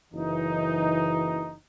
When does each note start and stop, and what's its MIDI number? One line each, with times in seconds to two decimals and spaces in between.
0.13 1.55 30
0.13 1.55 52
0.13 1.55 63